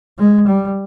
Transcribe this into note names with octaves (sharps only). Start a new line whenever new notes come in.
G#3
G3